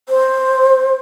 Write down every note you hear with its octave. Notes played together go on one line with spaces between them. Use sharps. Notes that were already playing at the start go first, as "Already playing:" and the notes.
C5